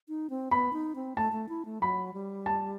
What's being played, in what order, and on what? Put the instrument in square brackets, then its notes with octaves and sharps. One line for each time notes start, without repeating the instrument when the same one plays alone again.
[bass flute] D#4
C4
[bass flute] B3 [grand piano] B5
[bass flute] D#4
C4
[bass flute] A3 [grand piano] A5
[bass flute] A3
E4
A3
[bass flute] F#3 [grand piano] B5
[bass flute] G3
[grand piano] A5